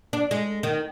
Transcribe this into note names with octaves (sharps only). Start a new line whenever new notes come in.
D4
G#3
D#3